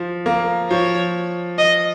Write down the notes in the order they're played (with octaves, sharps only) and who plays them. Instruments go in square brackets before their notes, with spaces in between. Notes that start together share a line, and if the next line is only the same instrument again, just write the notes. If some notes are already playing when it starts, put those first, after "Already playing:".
Already playing: [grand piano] F3
A#3
[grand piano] F3 [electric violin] C#5
[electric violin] D#5